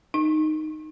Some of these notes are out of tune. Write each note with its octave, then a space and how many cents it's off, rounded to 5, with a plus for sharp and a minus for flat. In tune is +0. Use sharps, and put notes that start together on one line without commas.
D#4 -5